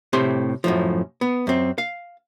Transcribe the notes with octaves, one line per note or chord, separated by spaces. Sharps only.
A2 C3 C4 G4 C6
F#2 A2 F3
B3
F#2 C4
F5